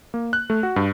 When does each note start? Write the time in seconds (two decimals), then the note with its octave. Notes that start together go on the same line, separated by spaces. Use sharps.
0.14 A#3
0.33 F#6
0.50 A3
0.63 F#4
0.76 G2